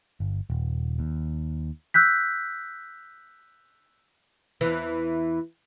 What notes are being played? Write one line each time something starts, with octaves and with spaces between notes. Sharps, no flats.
G1
D#1
D#2
E6 F#6 G6 B6
E2 E3